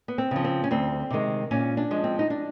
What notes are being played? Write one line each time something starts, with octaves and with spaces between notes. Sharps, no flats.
B3
C4
C#3 F3
C4
C#4
D2 C4
C3 D#3 G#3
A#2 C#4
D4
F3 G#3
C4
D#4
D4